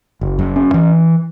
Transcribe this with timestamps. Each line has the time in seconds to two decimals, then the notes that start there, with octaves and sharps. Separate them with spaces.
0.21 F#1
0.39 F#2
0.56 C#4
0.74 E3